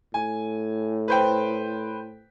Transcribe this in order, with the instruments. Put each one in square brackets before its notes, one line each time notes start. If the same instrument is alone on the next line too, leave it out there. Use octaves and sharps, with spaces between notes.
[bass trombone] A2 [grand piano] G#5
[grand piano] B4 C5 G5